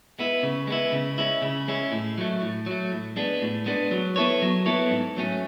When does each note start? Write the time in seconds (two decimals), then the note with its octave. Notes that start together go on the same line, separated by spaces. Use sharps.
0.19 G#3 B3 E4
0.43 C#3
0.67 G#3 B3 E4
0.92 C#3
1.18 G#3 C#4 E4
1.42 C#3
1.68 G#3 C#4 E4
1.92 A2
2.18 F#3 A3
2.42 A2
2.66 F#3 A3
2.92 A2
3.16 G#3 B3 D4
3.42 A2
3.66 G#3 B3 D4
3.91 F#3
4.16 B3 E4 A4 C#5
4.42 F#3
4.66 B3 E4 A4 C#5
4.91 G#2
5.17 F#3 A3 C#4